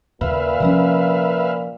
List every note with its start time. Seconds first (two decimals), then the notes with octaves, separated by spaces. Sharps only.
0.21 D#2 A#2 C#3 B4 E5 F5
0.60 C3 F3 C#4